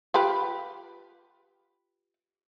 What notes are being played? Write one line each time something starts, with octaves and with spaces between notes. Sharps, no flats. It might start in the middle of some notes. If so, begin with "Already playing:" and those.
F4 G4 B4